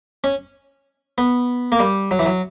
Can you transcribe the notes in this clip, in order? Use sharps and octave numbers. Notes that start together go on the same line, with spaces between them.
C#4
B3
A#3
G3
F#3
E3
F#3